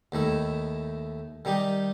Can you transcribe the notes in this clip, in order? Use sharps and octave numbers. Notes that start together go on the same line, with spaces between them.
D#2 D#3 A3 E4
D#3 G3 D#4 G4